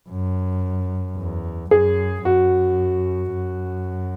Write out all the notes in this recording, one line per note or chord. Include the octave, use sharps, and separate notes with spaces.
F#2
E2
F#2 G#4
F#2 F#4
F#2